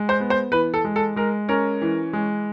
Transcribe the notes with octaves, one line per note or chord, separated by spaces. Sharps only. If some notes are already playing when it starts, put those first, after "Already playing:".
Already playing: G#3
C5
B3
C5
E3 B4
A4
G#3
A4
G#3 A#4
C#4 A#4
E3
G#3